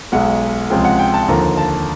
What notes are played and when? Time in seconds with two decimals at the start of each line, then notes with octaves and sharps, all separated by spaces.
0.12 B1 B2 G#3 F#5
0.70 C#2 C3 F3 G#3 G5
0.85 F#5
0.99 G5
1.14 A5
1.28 D#2 D3 F3 A#5
1.57 A5